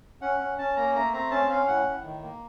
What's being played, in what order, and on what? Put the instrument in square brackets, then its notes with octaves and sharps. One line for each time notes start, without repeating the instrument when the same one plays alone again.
[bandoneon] C#4 F#5
C#4
C#4 A5
A#3 A#5
A3 A#5
C4 A#5
C#4 A5
C#4 F5
A2 F#5
A2
D#3
A#3